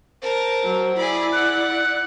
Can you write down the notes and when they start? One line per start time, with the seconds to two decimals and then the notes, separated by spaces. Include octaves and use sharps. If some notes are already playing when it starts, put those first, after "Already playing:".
0.22 A#4 C5 A5
0.64 F#3
0.96 E4 G#4 D5 B5
1.33 F#5 F#6